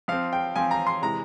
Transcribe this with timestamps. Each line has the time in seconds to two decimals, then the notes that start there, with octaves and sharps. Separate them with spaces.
0.08 F3 C4 F5
0.33 G5
0.56 F3 C4 G#5
0.71 A#5
0.87 C6
1.02 C3 E3 G#3 A#5